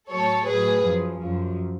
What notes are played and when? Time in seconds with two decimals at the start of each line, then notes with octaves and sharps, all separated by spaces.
0.11 A2 F#3 A4 C#5
0.47 A2 F#3 G#4 B4
0.84 F#2 F3
1.19 F#2 F3